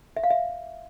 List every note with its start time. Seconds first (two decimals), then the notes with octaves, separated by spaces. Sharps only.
0.17 E5
0.24 F5
0.30 E5